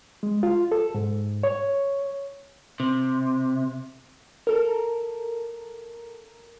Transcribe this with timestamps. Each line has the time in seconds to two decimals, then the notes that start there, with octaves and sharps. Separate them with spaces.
0.23 G#3
0.43 F4
0.72 A4
0.95 G#2
1.43 C#5
2.80 C3
4.47 A4 A#4